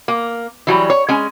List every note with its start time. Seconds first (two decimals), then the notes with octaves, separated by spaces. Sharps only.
0.08 A#3
0.67 E3 F#3 G3
0.90 C#5
1.09 G#3 C#4 G#5